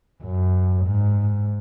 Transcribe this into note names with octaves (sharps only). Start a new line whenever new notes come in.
F#2
G#2